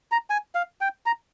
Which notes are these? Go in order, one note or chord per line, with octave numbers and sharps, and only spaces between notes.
A#5
G#5
F5
G5
A#5